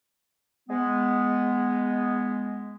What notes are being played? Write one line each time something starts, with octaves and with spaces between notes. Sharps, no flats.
G#3 B3